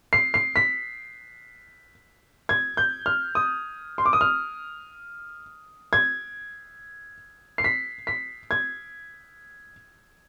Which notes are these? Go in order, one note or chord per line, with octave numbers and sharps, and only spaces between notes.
C7
C7
B6
G#6
G6
F6
D#6
C6
D6
D#6
F6
G#6
C7
B6
B6
G#6